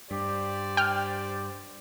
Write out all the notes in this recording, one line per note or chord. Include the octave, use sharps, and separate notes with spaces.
G2 G4 C5 D5
G5 F6